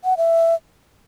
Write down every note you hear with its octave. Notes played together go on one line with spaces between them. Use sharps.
F#5
E5